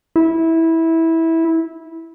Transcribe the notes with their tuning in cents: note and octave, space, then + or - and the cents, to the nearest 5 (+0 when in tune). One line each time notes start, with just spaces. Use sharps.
E4 -15